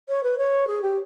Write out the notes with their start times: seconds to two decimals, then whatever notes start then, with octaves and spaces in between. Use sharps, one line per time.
0.08 C#5
0.23 B4
0.38 C#5
0.67 G#4
0.82 G4